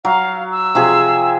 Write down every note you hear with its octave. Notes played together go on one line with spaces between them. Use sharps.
F#3 F5
E6
C3 F3 G#4